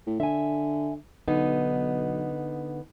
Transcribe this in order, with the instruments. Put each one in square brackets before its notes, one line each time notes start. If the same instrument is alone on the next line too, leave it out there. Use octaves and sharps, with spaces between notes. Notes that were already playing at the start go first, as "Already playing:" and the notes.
[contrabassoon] A2
[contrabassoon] D3 [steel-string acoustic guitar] E5 G#5
[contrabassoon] B1 [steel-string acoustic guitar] D3 B3 D#4